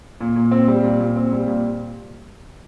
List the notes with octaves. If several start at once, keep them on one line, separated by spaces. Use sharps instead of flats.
A#2
A#2
C4
G3
A#2
A#2
C4
G3
A#2